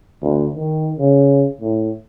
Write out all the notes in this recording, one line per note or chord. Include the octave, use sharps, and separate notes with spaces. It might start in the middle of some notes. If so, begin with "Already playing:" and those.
D2
D#3
C#3
A2